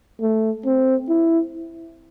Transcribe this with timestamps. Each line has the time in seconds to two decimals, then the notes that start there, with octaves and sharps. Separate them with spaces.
0.21 A3
0.65 C4
1.09 E4